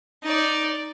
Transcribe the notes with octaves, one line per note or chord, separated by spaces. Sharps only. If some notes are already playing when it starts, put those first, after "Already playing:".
D#4 D5